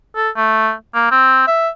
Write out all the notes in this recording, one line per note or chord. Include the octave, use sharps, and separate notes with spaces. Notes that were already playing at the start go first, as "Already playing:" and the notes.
A4
A3
A#3
C4
E5